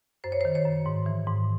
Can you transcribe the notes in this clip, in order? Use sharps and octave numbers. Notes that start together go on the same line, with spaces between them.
F#2 C5
C#5
C5
D#3
C#5
F#2
G#2
E3
G#2